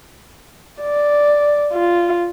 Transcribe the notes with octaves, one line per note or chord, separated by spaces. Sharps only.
D5
F4